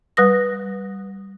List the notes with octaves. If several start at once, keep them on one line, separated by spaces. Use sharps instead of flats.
G3 B4 D#6 A#6